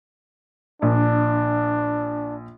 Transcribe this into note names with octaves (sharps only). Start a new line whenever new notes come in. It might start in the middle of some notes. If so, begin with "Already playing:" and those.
A#1 D4